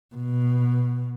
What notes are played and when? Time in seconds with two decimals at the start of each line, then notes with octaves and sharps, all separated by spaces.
0.15 B2